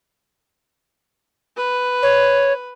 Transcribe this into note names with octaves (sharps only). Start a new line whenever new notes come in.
B4
C#5